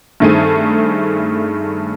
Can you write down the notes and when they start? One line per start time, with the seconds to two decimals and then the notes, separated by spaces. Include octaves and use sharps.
0.20 G2 D#3 A3 C4 G#4 D#7